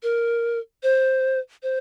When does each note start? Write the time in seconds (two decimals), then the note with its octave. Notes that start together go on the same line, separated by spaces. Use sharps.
0.03 A#4
0.83 C5
1.63 C5